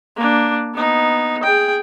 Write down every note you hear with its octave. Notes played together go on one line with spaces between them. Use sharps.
A#3 D4
B3 D#4
G#4 G5